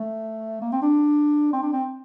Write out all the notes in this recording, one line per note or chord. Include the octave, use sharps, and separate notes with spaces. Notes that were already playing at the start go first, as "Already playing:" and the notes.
Already playing: A3
A#3
C4
D4
C4
D4
C4